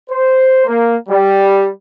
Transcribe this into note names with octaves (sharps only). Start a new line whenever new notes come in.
C5
A#3
G3